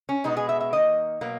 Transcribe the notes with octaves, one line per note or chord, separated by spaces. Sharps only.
C#4
B2 G#3 B3 D#4
G#4
E5
E5
D#3 A#3 D#5
B2 F#3 A#3